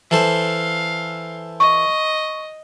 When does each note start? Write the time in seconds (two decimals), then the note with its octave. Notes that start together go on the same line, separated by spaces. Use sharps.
0.11 E3 A4 C5 F5
1.60 D#5 C#6